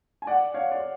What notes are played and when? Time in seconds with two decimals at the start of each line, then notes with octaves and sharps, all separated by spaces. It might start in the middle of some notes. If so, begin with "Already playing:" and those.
0.22 G#5
0.27 D5 F#5
0.54 C#5 F5
0.72 D5